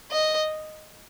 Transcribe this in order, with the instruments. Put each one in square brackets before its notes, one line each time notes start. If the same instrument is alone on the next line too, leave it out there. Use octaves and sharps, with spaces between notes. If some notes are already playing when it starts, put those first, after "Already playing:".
[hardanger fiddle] D#5